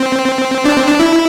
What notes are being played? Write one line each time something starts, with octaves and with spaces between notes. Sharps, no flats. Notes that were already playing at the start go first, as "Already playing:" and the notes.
Already playing: C4
D4
C4
D4
E4